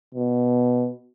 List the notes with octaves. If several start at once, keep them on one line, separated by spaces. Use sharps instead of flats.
B2